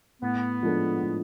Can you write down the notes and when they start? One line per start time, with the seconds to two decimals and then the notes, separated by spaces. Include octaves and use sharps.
0.22 A2 B3
0.63 F3 G#3 D4 A4
1.03 A2